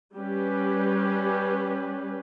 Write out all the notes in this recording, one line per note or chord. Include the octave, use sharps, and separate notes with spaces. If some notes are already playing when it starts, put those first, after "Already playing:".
G3 C#4 G4 B4